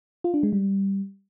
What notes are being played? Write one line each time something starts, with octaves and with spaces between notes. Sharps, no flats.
F4
D4
G#3
G3